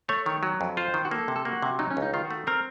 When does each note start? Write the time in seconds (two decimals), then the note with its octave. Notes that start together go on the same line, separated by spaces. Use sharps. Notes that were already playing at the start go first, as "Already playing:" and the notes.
0.09 A3 C#5
0.26 D#3 C#5
0.43 F#3
0.61 F2
0.77 F4 C5
0.94 D#3
1.05 F#4
1.11 A#3 A4
1.28 C3
1.36 A4
1.45 A#3 F#4
1.62 C3
1.79 F#3 D#4
1.90 C#4
1.97 C#2
2.02 D#4
2.13 D#3 F4
2.25 F#4
2.31 A3
2.47 C4 A#4